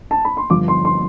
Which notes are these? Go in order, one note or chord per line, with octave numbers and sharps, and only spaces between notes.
A5
B5
C6
G1 G2 F3 D6
C6
C6